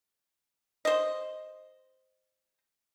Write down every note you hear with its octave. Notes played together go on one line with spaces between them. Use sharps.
C5 D#5